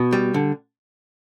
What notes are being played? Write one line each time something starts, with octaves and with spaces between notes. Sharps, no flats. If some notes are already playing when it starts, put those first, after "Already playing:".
Already playing: B2
G3
D3